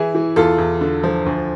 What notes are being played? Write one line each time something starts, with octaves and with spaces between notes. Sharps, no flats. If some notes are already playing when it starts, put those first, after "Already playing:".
Already playing: E3 E4 G#4
E3
E2 F4 A4
E2
D3
F3
D2